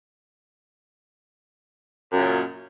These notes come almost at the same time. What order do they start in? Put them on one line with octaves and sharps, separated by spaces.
F#2 A#2 C#3